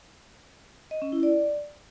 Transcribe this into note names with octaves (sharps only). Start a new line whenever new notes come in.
D#5
C#4
E4
D5